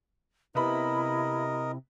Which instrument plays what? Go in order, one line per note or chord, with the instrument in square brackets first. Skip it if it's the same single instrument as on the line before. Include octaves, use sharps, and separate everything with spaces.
[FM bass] C3 [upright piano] B3 E5 B5 [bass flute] E4 [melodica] A#4 D#5